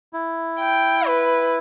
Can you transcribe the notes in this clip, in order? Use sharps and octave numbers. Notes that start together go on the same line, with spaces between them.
E4
G5
B4